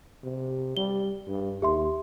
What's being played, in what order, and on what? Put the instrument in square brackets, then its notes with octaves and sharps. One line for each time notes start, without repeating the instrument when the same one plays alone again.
[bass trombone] C3
[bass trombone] G3 [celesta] G7
[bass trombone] G2
[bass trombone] D#2 [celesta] G4 E5 C6